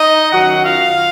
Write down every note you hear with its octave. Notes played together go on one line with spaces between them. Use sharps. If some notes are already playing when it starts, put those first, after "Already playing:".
Already playing: D#4 D#5
F#2 D#3 F#3 F#4 F#5
F4 F5